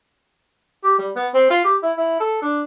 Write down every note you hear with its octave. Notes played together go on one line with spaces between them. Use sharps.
G4
G3
B3
C4
F4
G4
E4
E4
A4
D4